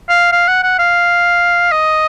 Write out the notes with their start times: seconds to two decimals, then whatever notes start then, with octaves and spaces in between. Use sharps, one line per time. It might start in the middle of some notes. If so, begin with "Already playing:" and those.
0.09 F5
0.32 F5
0.48 F#5
0.63 F#5
0.79 F5
1.72 D#5